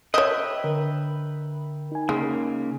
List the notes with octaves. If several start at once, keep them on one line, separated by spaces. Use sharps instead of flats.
B4 C#5 D#5 E5 G5
D3 A#4
D#4 G#5
C#3 G#3 A#3